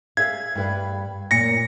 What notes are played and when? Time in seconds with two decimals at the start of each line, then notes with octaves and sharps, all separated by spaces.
0.17 G#4 E5 F5 G#6
0.55 G2 B4
1.31 F#2 A#2 A#6 C#7